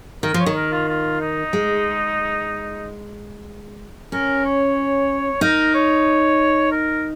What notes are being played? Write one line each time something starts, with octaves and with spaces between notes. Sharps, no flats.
D#3 A#4
F3 C#5
D#3
A#4
F4
F4
D#4
G#3
C#4 A#4
C#5
D#4 A#4
C#5
A#4